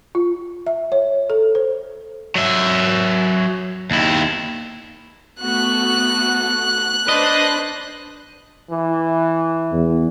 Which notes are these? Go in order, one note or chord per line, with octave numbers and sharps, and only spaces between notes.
F4
E5
C#5
A4
C5
F#3 E5
D#2 E4
A3 B3 F#4 F#6
D4 B4 C5 D#5
E3
E2